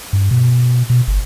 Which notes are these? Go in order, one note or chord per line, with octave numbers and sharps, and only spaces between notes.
G2
B2
B2
G1